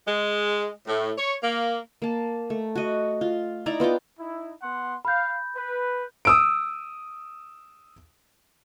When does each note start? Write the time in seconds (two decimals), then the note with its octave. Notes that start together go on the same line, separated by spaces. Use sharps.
0.07 G#3
0.87 A2
1.18 C#5
1.43 A#3
2.02 A#3 A5
2.50 A3
2.75 F#4 D#5
3.21 F4
3.66 D#4 E4 D5 A#5
3.80 B3 F4 G5 D6
4.18 D#4 E4
4.62 B3 F#5 C6
5.05 F5 B5 G6
5.56 B4
6.25 D#6 E6 D7